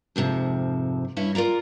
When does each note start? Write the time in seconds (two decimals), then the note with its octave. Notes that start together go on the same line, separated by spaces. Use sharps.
0.16 F2 G#2 C3 F3
1.16 G2 C#4 E4
1.35 F4 A#4 D5 A#5